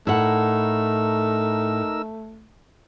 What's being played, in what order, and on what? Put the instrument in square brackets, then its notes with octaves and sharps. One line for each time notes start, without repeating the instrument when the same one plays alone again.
[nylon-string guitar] A2 F#5 [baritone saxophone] A3 [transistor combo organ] D#4 A#4 E6